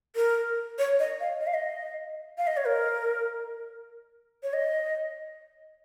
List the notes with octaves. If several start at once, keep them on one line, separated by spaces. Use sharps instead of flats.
A#4
C#5
D#5
F5
D#5
F5
D#5
F5
D#5
C#5
A#4
C#5
D#5